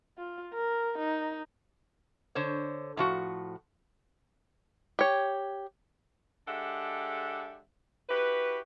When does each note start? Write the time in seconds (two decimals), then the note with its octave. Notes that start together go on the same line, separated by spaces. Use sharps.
0.18 F4
0.54 A#4
0.98 D#4
2.35 D3 C5 C#5
2.97 A2 F3 F#4
4.99 G4 C#5
6.48 G#3 D4 G4 A4 E5 F#5
8.09 E4 F#4 G4 B4